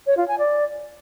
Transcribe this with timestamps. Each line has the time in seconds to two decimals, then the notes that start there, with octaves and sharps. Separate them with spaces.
0.07 C#5
0.17 F4
0.28 G#5
0.39 D5